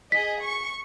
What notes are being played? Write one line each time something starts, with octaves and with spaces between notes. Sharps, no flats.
G#4 D#5 B6
C#6